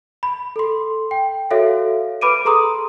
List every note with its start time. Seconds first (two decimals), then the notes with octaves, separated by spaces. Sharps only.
0.23 B5
0.56 A4 C6
1.11 G5
1.51 F#4 A4 C#5 E5 F5
2.21 B4 B5 D6 D7 D#7
2.45 G#4 A4 A#5 C6 D#6